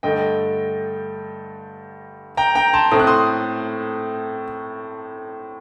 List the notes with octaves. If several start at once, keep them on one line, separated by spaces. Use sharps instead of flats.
G2 D3 A3 D#5 G5
G5 A#5
G5 A#5
A5 C6
A2 A3 C4 D#6
F#6
C6 D#6